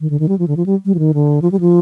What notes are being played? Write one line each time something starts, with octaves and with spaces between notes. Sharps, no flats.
D#3
D3
D#3
G3
F3
D3
F3
G3
G3
F3
D#3
D3
F3
G3
F3